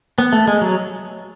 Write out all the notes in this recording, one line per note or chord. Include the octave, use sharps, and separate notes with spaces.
B3
A3
G#3
F#3